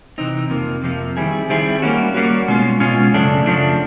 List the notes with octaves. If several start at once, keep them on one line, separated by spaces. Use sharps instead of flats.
C3 E3 C4 D#4
F2 C3 F3 A#3
F2 C3 F3 A#3
D#3 G3 C4 E4 G#4
D#3 G3 C4 E4 G#4
G3 A#3 C#4 F#4
G3 A#3 C#4 F#4
B2 G#3 C#4 F4
B2 G#3 C#4 F4
F#2 C#3 F3 A3 D4
F#2 C#3 F3 A3 D4